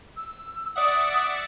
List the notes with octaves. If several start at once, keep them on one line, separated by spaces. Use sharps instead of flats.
E6
D5 E5 F#5 D#6